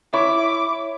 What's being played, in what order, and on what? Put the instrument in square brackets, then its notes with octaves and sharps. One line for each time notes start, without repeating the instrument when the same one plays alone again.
[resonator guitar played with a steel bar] E4 [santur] C#5 [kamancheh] D6